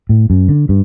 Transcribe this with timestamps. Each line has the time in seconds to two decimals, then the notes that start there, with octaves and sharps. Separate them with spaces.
0.09 A2
0.30 F#2
0.49 D3
0.69 G2